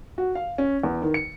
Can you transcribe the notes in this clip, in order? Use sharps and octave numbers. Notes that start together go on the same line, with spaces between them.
F#4
F5
C#4
E2
D#3
C#7